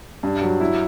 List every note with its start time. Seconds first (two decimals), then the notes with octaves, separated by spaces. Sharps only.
0.23 G2
0.42 F#3
0.61 E4